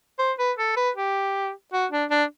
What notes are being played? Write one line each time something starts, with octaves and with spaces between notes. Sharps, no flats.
C5
B4
A4
B4
G4
F#4
D4
D4